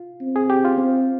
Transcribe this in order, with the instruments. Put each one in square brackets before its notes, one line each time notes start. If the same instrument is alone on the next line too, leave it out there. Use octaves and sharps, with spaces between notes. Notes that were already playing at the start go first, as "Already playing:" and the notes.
Already playing: [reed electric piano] F4
[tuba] C4
[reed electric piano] G#4
G4
F4
[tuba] C4